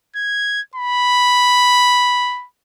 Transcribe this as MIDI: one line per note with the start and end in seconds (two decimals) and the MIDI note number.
0.16 0.61 92
0.76 2.46 83